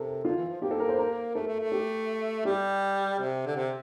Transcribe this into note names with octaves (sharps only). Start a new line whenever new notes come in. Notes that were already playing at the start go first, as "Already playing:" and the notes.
Already playing: C3 A4 A#4
D3 F4
E3
F3
A#3 G4
A4
A#4
C5
A#4
A3 A4
A3
A3
G4
G3 G4
C3
D3
C3